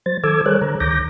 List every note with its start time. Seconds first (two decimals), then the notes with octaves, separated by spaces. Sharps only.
0.06 F#3 C5 A6
0.24 D#3 A4 D6 E6 G#6
0.46 G3 G#4 A#4 C5 C#5 F#6
0.61 D3 A#5
0.80 D2 D#3 D6 G6 A#6